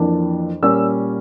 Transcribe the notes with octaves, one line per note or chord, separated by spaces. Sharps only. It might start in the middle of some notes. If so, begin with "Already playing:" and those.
Already playing: F2 E3 A#3 D4
A#2 G3 A#3 C#4 E6